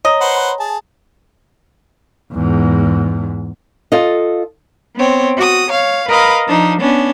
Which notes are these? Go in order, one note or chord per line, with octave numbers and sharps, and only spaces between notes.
C#5 D#5 A#5 D#6
B4 C5 F#5
G#4 A5
E2 G#2
F4 A4 D#5
B3 C4 C#5
F#4 D#6
C#5 F5
A#4 B4 D#5 F5 B5
F3 D4 D#4
B3 C#4 D4